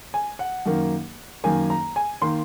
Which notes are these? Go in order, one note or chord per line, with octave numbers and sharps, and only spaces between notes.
G#5
F#5
F#2 D#3 A#3
F#2 D#3 A#3 G#5
A#5
G#5
D#3 A#3 C6